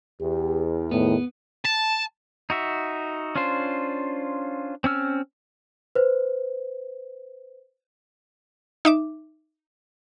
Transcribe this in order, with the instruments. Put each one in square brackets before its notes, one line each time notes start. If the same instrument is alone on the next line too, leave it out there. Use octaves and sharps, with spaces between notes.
[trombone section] E2 [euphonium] G4
[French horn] A2 [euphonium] D#3 [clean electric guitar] B3
[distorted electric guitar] A5
[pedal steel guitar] D#4 F#4 E5
C#4 D4 F4 C5
C4 C#4 E6 F6
[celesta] B4 C5
[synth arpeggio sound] D#4 E5 D6